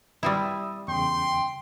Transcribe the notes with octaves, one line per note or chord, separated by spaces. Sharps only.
G3 C4 E4 E5 D#6 E6
E2 C#3 G5 C6